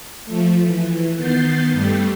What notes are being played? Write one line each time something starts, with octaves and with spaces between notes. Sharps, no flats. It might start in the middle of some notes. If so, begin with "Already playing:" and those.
F3 A3
E3
D#3 B3 G6 A6 C7
G2 G3 A3